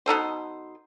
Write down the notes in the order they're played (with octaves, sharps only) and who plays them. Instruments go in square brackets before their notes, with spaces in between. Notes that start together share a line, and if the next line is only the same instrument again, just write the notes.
[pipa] B2 D#4 A4 C5